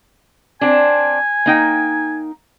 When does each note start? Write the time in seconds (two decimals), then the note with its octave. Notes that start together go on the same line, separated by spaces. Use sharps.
0.61 C4 D4 G#5
1.46 A#3 D#4 G5